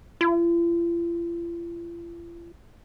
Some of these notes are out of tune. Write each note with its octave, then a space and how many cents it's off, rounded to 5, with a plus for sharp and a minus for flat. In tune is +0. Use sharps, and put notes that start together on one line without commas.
F4 -45